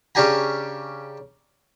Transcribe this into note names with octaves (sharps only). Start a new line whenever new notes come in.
C#3 C#4 D4 G4 G#5 A#5